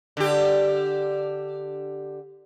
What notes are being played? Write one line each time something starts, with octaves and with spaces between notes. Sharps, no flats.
D3 G4